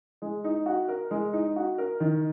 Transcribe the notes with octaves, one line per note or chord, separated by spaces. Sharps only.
G#3
D#4
F#4
A#4
G#3
D#4
F#4
A#4
D#3